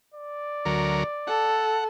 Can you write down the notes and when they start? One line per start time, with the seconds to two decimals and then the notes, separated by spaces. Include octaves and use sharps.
0.14 D5
0.65 D2 F#3 A#4
1.27 A4 F#5